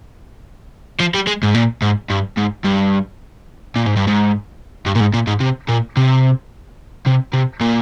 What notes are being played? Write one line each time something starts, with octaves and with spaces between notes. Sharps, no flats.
F3
G3
G#3
G#2
A#2
G#2
G2
G#2
G2
A#2
G#2
G2
G#2
G2
A#2
G#2
A#2
G#2
C3
A#2
C3
C3
C3
A#2